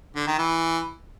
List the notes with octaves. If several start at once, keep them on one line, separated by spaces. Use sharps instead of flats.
D3
D#3
E3